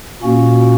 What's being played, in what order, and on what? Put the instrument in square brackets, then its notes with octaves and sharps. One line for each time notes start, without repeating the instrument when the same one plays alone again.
[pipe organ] A#2 A#3 C#4 F#4